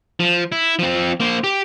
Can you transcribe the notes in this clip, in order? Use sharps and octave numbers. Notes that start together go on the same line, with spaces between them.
F3
E4
F3 C4
A#3 C5
G4